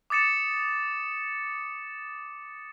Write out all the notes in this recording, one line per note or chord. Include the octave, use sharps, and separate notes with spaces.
D6 D#6 A6 C#7 E7